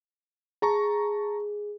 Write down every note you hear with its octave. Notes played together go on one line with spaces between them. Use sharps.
G#4 A5 A#5 C#6